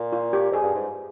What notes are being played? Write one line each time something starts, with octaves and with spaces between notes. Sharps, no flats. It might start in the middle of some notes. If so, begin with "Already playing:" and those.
Already playing: A#2
F4
G4
F2 G#4
G2
G#2